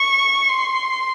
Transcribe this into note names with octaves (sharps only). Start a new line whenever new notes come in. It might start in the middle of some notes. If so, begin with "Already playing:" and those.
Already playing: C#6
C6